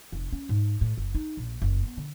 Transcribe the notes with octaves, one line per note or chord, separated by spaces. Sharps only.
F1
C#4
G#2
A2
F#1
D#4
A#1
F#1
B3
D3